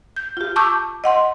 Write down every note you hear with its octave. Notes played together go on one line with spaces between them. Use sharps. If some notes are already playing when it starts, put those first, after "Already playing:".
G6
F4 G4
A5 C#6 D6 E6 G6
D#5 F#5 C6